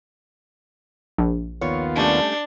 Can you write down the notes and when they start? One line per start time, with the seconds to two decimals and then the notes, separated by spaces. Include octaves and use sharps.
1.18 A#1
1.61 D#2 B3 F4 C#5
1.96 G3 A3 C#4 D4